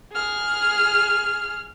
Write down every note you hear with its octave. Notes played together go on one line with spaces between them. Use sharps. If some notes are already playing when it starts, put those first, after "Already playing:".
G#4 F6